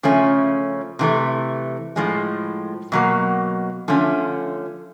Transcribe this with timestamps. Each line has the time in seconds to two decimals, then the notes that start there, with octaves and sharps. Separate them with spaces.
0.03 C#3 F3 A3 C#4
0.99 C3 E3 A3
1.96 A2 F3 G#3
2.92 B2 F#3 A#3
3.88 D3 F3 A3 C#4